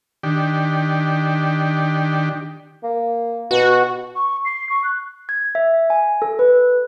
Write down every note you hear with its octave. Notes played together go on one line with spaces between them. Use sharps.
D#3 D4 G4
A#3
B2 F#4
C#6
C7
C#6
F#6
G#6
E5
G#5
A4
B4